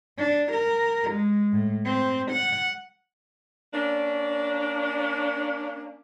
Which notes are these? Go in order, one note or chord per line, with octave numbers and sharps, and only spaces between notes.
D4
A#4
G#3
A2
C4
F#5
A#3 C#4 D4